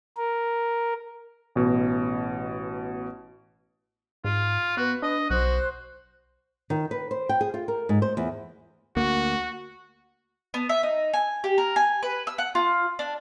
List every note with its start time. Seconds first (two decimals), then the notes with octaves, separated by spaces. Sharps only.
0.17 A#4
1.55 A1 B2
4.24 G#2 F4
4.77 B3 F#4 B4
5.02 D4 D#5
5.30 B1 F#4 C5 F#6
6.70 D#3
6.91 B4
7.11 C5
7.29 G5
7.41 G#4
7.54 F4
7.68 A#4
7.89 G#2
8.02 C5
8.17 E2
8.96 D2 A#3 F#4
10.54 B3
10.69 E5
10.83 D#4
11.13 G#5
11.44 G4
11.58 A#4
11.76 G#5
12.03 B4
12.27 E6
12.38 F#5
12.55 F4
12.99 D4